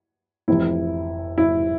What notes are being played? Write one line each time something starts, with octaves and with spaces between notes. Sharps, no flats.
F1 F2 E3 E4
E4